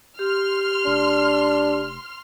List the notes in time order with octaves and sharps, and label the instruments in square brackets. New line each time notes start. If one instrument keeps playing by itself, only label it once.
[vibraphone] G4 [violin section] C6 F6
[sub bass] F1 [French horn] D4